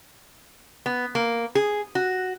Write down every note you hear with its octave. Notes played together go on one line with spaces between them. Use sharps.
B3
A#3
G#4
F#4